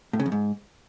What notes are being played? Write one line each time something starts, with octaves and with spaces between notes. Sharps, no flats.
A2
C#3
F2
G#2